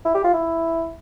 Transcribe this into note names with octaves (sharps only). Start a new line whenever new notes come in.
E4
G4
F4
E4